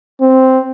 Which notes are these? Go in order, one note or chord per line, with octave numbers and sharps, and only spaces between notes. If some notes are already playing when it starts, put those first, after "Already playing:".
C4